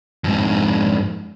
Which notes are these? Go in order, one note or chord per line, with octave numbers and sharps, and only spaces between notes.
F2 G#2